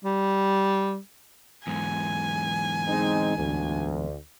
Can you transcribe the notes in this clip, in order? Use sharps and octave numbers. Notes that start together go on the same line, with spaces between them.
G3
E2 G#2 G#5
G#3 C4 D#4
D2